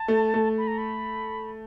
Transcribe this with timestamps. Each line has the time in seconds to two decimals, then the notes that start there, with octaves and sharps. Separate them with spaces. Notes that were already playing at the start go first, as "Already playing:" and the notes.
Already playing: A5
0.08 A3
0.34 A3
0.58 B5
0.67 A#5
0.78 B5